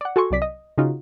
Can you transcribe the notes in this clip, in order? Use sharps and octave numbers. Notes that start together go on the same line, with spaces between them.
D5 F#5
F#4 A4 G#5 C6 C#6
C2 F#3 D5 B6
D#5
C#3 D#4 F4 F#4